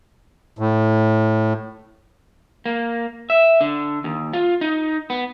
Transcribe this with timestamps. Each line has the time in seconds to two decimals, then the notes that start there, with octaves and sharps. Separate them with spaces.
0.59 A2
2.66 A#3
3.30 E5
3.61 D3
4.04 D#2
4.33 F4
4.61 D#4
5.10 B3